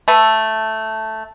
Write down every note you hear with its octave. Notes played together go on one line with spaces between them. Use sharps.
A3 A4 B4